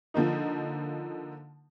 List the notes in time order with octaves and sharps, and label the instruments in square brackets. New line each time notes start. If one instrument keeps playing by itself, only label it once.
[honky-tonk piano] D3 F3 A#3 D#4